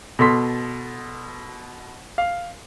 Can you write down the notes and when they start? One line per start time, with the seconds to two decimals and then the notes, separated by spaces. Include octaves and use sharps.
0.19 B2 A4 C6 B6
2.18 F5